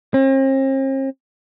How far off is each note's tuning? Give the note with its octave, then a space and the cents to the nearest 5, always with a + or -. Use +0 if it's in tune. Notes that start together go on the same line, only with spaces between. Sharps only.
C4 +45